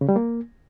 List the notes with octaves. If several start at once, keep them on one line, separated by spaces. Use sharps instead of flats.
C#3
G3
A#3